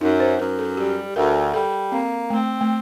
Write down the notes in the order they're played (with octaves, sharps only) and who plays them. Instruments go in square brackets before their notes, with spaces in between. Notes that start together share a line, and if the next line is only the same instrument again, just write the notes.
[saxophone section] F#2 [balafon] D#4
[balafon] C5
[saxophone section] F#2 [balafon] A#4
[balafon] A4
[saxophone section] G3 [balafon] G4
[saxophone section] D2 [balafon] A#4
[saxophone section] G3 [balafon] A4
[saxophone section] A#3 [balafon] C4
[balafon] A3 [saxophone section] C4
[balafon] A3